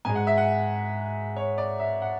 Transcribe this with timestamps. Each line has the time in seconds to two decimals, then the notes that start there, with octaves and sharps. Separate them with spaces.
0.05 G#2 G#3 G#5
0.15 F#5
0.27 E5
0.38 F#5
1.37 C#5
1.58 D5
1.80 E5
2.02 F#5